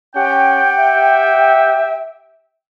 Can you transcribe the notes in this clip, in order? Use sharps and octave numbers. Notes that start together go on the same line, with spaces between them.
C#4 G4 F#5 G5
E5